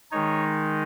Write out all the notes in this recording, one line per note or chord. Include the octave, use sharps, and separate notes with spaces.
D#3 G#3 D#4 C#5